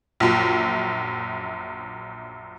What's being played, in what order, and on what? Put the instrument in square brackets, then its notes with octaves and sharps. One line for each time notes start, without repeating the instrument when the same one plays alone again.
[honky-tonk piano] A#1 F#2